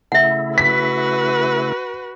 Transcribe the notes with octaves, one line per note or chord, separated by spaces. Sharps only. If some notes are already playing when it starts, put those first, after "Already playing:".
C#3 A3 E4 E5 F#5
F#4 B4 B6